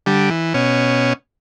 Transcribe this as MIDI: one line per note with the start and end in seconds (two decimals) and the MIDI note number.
0.06 0.30 50
0.06 0.30 55
0.30 0.53 52
0.54 1.13 47
0.54 1.13 61